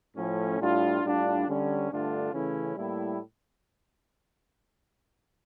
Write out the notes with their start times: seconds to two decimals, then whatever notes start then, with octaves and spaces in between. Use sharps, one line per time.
0.16 A2 F3 A3 C#4
0.59 A2 G3 D4 F4
1.03 A2 G3 D4 F4
1.47 D3 G3 C#4
1.90 G2 D3 A3 D4 F4
2.32 C#3 E3 A3 C#4 E4
2.77 A2 G3 A#3 E4